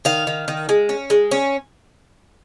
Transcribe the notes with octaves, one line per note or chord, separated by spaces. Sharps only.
D#3 F5
D#3
D#3
G#3
C#4
G#3
C#4